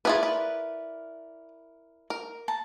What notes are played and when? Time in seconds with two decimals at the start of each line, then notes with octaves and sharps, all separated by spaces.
0.05 E4 F4 G#4 A#4 B4 D5
0.23 B4
2.10 A#4
2.48 A5 A#5